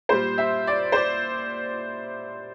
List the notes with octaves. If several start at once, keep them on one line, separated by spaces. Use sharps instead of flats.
A#2 G3 C5
E5
D5
C5
D5